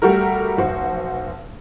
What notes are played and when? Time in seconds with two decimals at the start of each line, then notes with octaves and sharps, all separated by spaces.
0.02 G3 A3 F#4 G4 A#4
0.57 F1 B1 F#4 C5